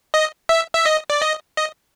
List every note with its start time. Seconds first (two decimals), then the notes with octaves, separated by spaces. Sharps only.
0.14 D#5
0.49 E5
0.75 E5
0.86 D#5
1.10 D5
1.22 D#5
1.57 D#5